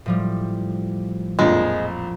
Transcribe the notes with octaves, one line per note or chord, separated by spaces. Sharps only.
A2 F3 G3
A#1 F2 F3 G#3